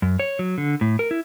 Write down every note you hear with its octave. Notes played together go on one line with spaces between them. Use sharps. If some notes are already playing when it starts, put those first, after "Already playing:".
F#2
C#5
F#3
D3
A2
A#4
E4